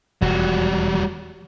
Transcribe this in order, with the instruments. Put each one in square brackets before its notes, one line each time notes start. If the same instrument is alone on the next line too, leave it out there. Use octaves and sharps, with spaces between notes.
[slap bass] E1 F2 [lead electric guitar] G3 F#4